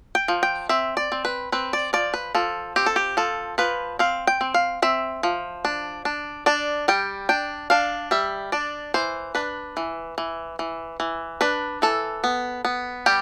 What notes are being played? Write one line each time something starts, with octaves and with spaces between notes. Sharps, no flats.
G5
F3
G5
C4 E5
D5
C4
B4
C4 B4
D5
F3 D5
B4
F3 A4
C4 G4
A4
G4
F3 A4
F3 B4
C4 F5
G5
C4
F5
C4 E5
F3
D4
D4
D4 D5
G3 G5
D4 G5
D4 F5
G3 E5
D4 D5
E3 C5
D4 B4
E3
E3
E3
E3
D4 B4
E3 A4
B3
B3
G3 G4